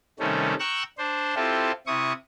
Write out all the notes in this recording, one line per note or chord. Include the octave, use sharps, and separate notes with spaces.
C3 D#3 G3 A3 C#4
G5 A#5 C#6 E6 F#6
D4 C5
C4 E4 F4 G4 A4
C3 E4 C#6 D#6